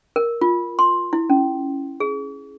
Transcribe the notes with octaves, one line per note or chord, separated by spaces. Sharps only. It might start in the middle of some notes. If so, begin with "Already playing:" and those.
A#4
F4
C6
E4
C#4
G#4